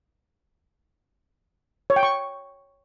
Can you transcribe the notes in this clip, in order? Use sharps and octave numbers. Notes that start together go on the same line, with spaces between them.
C#5
G5
C#6